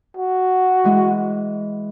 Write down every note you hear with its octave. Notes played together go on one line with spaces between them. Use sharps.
F#4
E3 G#3